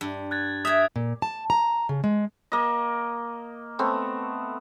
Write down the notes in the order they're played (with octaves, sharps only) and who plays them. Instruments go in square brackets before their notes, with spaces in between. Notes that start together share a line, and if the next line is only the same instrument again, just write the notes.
[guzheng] G2
[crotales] F#6 G#6 A6
[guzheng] E5 G5 [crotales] D#6 G#6
[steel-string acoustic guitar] A#2
A5
A#5
C#3
G#3
[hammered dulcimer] A#3 D#5
A3 B3 C4